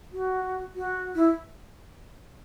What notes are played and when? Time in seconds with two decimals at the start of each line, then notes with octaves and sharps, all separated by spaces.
0.13 F#4
0.75 F#4
1.15 E4